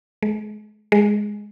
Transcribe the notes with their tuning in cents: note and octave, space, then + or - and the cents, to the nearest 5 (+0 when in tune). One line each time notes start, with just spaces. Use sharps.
G#3 +35
G#3 +0